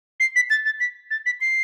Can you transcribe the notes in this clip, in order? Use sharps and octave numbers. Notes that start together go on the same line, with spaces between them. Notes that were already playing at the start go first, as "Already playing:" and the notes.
C7
B6
A6
A6
B6
A6
B6
C7